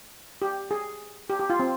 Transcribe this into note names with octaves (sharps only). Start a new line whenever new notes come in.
G4
G#4
G4
G4
F4
C4